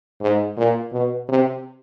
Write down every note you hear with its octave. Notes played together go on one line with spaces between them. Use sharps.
G#2
A#2
B2
C3